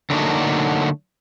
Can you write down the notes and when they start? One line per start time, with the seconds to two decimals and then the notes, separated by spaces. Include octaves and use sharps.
0.10 D3 F#3 A3 A#3 D4 D#4